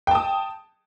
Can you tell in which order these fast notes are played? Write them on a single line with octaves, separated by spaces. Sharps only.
G5 A5 D#6